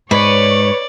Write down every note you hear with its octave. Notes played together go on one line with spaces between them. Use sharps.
G#2 B4 C#5 D5